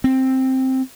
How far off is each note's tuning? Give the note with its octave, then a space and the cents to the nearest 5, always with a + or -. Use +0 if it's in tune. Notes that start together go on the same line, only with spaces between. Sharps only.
C4 +5